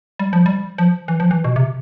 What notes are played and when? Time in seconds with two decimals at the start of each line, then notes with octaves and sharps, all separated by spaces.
0.19 G3
0.33 F3
0.46 G3
0.78 F3
1.08 E3
1.20 F3
1.31 E3
1.44 B2
1.56 C3